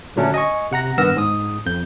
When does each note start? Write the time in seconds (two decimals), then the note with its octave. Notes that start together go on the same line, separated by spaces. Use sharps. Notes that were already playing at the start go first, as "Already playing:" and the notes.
0.16 A#2 D3 F#3 A3 C#4 D4
0.34 D#5 G#5 C#6
0.71 C3 F#5 A#5 A#6
0.98 G2 D#3 B3 E6 F6 A#6
1.16 G#2 D#6
1.66 F2 G6